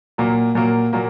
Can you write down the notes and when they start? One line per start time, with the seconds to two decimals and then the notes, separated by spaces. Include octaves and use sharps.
0.18 A#2 F#3 A#3
0.55 A#2 F#3 A#3
0.93 A#2 F#3 A#3